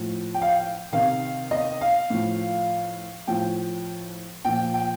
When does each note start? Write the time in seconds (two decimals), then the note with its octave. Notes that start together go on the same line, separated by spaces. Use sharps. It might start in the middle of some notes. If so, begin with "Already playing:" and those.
Already playing: A2 F3
0.34 G5
0.42 F5
0.48 G5
0.92 C3 D#3 F5
1.51 D#5
1.81 F5
2.10 A2 F3
3.27 A2 F3 G5
4.45 A#2 F3 G5
4.74 G5